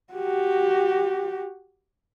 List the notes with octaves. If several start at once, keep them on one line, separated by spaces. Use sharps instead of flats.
F#4 G4